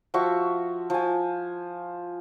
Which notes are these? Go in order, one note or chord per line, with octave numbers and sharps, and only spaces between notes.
F3 F#4 E5 C#6
F3 G#5